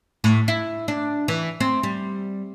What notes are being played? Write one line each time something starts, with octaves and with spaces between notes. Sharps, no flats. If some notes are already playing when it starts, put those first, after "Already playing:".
A2
E4
D4
E3
C4
G3